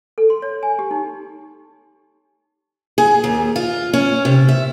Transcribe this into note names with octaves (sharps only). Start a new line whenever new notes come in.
A4
C6
C#5
G#5
G4
D#4
G#4
D#2
F4
C#4
C3
E5